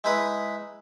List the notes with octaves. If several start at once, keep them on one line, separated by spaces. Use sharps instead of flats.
G#3 D#4 E4 B4 D#6